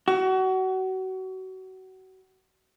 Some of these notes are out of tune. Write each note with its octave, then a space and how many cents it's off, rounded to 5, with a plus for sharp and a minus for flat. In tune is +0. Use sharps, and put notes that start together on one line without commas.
F#4 +30